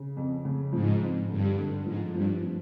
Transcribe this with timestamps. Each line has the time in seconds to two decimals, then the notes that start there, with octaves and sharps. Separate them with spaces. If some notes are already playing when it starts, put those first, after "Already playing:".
Already playing: C#3
0.17 F2
0.45 C#3
0.72 G#2 F3
1.01 F2
1.29 G2 D3
1.57 D3
1.86 G#2 F3
2.14 G2 F3
2.42 F3